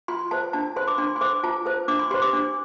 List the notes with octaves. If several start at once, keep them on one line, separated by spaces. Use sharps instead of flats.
F4 C6
A4 C5 A5
D4 A5
A4 C5 C6
D6
D4 C6
C6
A4 C5 D6
F4 A5
A4 C5
D4 D6
C6
G4 C5 C6
D6
D4